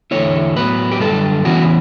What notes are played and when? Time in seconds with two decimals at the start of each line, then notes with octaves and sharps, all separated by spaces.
0.11 E2 D3 A3 C#4 E4 C#5
0.56 A2 F#3 B3 B4
0.92 G4
1.00 F#2 D3 G3 A4
1.45 C#3 E3 B3 E4 F#4